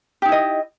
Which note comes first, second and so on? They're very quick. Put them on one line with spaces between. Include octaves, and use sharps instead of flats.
G4 D#4 E4 D#5